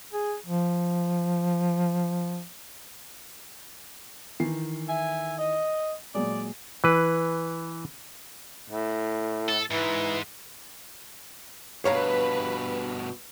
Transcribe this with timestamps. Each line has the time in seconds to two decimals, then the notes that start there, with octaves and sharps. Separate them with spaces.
0.13 G#4
0.47 F3
4.40 D#3 E3 C7
4.89 E5 G#5
5.39 D#5
6.15 A#2 F#3 G#3 D5
6.84 E3 B4
8.70 A2
9.49 A4
9.71 G#2 E3
11.85 G2 B2 B4 C#5 F5 A#5